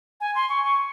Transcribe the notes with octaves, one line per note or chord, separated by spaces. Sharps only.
G#5
C6
C#6
C#6